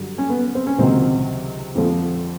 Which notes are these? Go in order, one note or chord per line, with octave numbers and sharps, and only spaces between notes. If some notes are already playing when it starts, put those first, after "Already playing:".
Already playing: G2 D3 F#3
C#4
B3
C4
C#4
C#2 C3 D#3 F#3 C4
F2 D3 F3